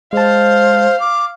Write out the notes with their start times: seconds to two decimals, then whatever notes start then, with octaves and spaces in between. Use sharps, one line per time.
0.13 G#3 C5 F5 A5
1.00 D6